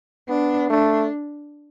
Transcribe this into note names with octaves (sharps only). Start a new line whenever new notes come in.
B3 D4
A3 D4